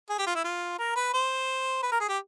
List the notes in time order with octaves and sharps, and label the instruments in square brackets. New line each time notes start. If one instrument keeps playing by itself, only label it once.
[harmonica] G#4
G4
F4
E4
F4
A#4
B4
C5
B4
A#4
G#4
G4